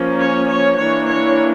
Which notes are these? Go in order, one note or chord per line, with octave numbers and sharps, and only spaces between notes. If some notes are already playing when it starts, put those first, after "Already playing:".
Already playing: F3 A#3 C#4
C#5
C#5
E3 A#3 D4 C#5
C#5